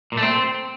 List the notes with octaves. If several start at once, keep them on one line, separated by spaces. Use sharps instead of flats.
A#2
A3
C4